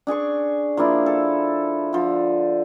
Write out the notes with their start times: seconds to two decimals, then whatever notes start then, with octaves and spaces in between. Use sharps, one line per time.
0.07 D4 G#4 G#5 C#6
0.77 F3 A#3 D4 E4
1.06 A4
1.93 D3 F3